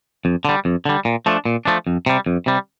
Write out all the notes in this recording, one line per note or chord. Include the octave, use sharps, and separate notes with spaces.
F2
D3 G3
F2
D3 G3
A#2
F3 A3 D4
A#2
F3 A3 D4
F2
C3 G3
F2
C3 G3